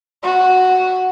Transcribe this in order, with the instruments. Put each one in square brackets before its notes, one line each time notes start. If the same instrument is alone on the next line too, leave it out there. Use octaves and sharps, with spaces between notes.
[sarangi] F#4